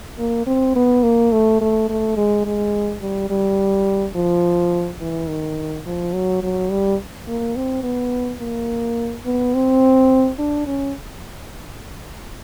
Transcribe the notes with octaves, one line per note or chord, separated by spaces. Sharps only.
A#3
C4
B3
A#3
A3
A3
A3
G#3
G#3
G3
G3
F3
E3
D#3
F3
F#3
F#3
G3
A#3
C4
B3
A#3
B3
C4
D4
C#4